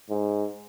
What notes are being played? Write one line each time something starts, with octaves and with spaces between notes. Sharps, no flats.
G#2